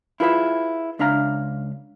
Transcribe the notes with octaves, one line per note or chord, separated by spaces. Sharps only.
E4 F4 G#4 B4 D5 E5
C#2 D4 E5 F5 A#5